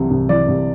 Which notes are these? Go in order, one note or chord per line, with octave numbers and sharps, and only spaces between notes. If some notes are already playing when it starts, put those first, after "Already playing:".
Already playing: C2 C3 E3
C2
E3 D5
C2